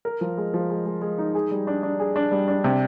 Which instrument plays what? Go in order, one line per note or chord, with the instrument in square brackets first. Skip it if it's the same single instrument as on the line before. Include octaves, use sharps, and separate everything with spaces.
[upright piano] A#4
F3
G#3
F3
G#3
G#3
G#3
D#4
G#4
G3
D4
D4
G#4
D4
G3
D4
C3